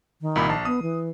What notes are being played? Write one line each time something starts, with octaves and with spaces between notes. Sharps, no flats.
D#3
C2 A#2 B5
A#1 A5 C7
B3 D#6
E3